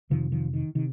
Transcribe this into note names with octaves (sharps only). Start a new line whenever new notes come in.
F2 C3 D#3 F3
D#3 F3
D#3
C3 D#3